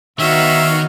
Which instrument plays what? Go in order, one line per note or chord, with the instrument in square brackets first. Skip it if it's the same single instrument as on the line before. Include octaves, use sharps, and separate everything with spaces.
[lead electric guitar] D#3 [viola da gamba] B3 D#4 F#4 [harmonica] C#5 F5 [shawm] E5